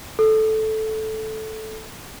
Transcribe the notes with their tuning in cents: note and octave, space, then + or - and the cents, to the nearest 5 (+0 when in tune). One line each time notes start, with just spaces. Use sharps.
A4 -10